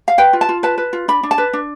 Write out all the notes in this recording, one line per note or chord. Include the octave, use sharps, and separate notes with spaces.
F5
B4 G5
F4
A5
F4
B4 A5
B4
F4
D4 B5
D4
A5
B4
D4